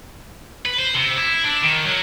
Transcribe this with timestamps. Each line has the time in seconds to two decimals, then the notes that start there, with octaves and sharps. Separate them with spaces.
0.65 B4
0.79 C5
0.94 C3
1.18 E4
1.44 D4
1.63 D#3
1.85 F#3